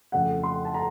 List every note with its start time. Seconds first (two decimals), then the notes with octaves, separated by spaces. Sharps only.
0.12 F2 C#3 A3 F#5
0.43 C6
0.65 A5
0.74 A#5